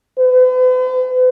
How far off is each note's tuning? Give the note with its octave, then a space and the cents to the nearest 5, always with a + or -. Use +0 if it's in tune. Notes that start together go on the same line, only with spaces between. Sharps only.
B4 +45